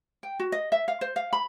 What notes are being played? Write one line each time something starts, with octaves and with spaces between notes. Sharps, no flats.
G5
F#4
D#5
E5
F5
C5
F5
B5